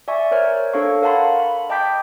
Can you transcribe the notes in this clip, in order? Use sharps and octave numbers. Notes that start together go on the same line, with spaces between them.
D5 E5 G#5 C#6
A#4 C5 C#5 F6
D4 A4 C#5 F5 C#6
A#4 F5 F#5 A5 B5 C6
B5
D#5 G5 A5 D6 G6 B6